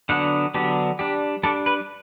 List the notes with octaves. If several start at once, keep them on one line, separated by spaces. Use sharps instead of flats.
D3 F#3 B3 D4 F#5
D3 F#3 B3 D4 G4
G3 D4 G4
G3 D4 A4
B4